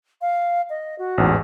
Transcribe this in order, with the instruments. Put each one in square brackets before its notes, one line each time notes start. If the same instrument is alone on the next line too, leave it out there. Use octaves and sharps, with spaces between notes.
[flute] F5
D#5
F#4
[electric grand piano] A1 E2 G#2